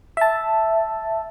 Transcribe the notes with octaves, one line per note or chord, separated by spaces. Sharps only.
E5 A5